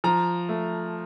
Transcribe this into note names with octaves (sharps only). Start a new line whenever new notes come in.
F3 A#5
A3